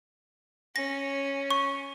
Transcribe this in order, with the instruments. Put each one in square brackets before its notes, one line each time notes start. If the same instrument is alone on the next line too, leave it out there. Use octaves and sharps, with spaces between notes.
[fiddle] C#4 [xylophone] A#6
[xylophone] C#6